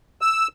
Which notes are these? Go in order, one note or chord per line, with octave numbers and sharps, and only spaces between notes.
E6